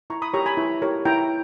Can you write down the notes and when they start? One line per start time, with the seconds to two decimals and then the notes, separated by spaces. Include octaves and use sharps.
0.10 E4 A#5 C#6
0.22 B5 D#6
0.33 G4 A#4 C#5 A#5 C#6
0.46 G#5 B5
0.57 E4
0.82 G4 A#4 C#5
1.05 E4 G5 A#5